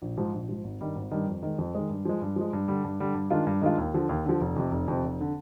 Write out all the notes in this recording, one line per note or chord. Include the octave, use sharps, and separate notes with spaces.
A#1
G#2 F3
A#1
G#2 F3
G#1
G2 D#3 G3
G#1
G2 D#3 G3
F2
D#3 G#3
F2
D#3 G#3
G2
F3 G#3
G2
F3 G#3
G2
D3 G3
G2
D3 G3
G2
D#3 G#3 D4 F4
G2
D#3 G#3 D4 F4
D#2
D3 F3
D#2
D3 F3
F1
F2 C3
F1
F2 C3
F1
D3